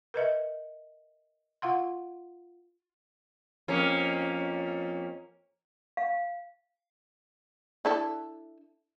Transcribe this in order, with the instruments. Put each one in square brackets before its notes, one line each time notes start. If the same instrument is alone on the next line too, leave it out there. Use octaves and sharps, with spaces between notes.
[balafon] A#4 B4 D#5 E5
F4 F5 F#5 C6
[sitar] F2 A#3 C#4
[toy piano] F5
[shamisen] D4 E4 A4